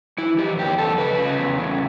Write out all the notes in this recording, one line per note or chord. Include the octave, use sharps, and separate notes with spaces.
E3 E4
E3 G4
E2 G4
E2 A4
C#3 B4
C#3
E2
C#3